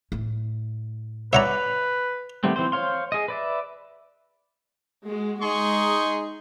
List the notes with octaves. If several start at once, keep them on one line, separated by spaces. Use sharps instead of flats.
A2
B4 C#5 D5 E5 F#5 A#5
D#3 G3 A3 B3 C4
E3 C4 C5
C5 C#5 F5 C6
G#4 D#5
B4 D5 E5
G#3 F#4
G#3 D#4 G#4 C6 C#6